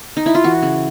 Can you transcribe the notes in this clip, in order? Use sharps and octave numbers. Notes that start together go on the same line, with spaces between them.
D#4
E4
F4
E3 F#4
C#3